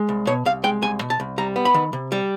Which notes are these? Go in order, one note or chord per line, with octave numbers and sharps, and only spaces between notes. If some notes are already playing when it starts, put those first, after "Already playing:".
Already playing: G#3
C2
B2 C#5
C2 F5
G#3 G5
C2 G#5
B2
A5
C2
G3 A#5
B3
B5
D#3
C3
G3